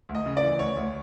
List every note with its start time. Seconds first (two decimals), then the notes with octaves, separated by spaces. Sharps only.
0.09 D2
0.15 D#5
0.26 C#3
0.37 D5
0.43 E3
0.59 D2 C#5
0.77 D2